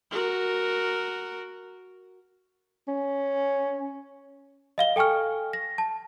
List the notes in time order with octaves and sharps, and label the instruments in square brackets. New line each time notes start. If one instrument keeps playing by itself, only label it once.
[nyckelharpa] F#4 A#4
[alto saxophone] C#4
[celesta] D#5 F5 G7
A4 G5 G#5 C#6 F6
A#6
A5